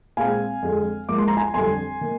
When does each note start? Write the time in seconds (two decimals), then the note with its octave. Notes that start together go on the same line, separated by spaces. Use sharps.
0.17 A#2 G#3 C4 F5 G#5
0.62 F2 D3 G#3
1.09 G#2 F3 A#3 D6
1.18 C6
1.28 A#5
1.37 G#5 C6
1.54 F2 D3 G3 G#5 C6
2.01 D#3 A#3